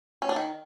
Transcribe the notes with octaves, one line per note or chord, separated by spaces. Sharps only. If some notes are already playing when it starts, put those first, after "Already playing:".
C#4
D4
D#3